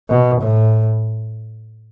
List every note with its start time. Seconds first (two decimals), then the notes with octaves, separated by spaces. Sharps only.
0.10 B2
0.41 A2